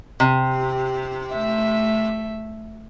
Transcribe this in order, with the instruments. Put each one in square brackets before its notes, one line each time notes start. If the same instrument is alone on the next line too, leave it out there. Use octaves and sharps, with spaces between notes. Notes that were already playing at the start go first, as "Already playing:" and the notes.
[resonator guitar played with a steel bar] C3
[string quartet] A3 E5